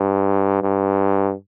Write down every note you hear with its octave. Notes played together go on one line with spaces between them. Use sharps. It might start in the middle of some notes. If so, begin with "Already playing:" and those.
Already playing: G2
G2